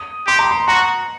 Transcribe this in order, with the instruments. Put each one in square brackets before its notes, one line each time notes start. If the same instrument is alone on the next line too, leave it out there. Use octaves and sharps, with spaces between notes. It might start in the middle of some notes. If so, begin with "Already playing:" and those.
Already playing: [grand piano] D#6
[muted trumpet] G4 [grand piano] C6
[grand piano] A#5
C6
[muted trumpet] F#4 [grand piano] A#5